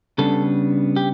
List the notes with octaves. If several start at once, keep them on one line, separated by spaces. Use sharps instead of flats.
C#3 G3 B3 D4 A4
G4